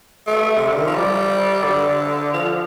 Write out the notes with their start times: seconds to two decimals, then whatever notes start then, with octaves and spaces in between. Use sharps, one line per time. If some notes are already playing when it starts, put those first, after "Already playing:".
0.27 A3
0.58 C3
0.68 D3
0.76 D#3
0.87 F3
0.96 G3
1.64 D3
2.33 F3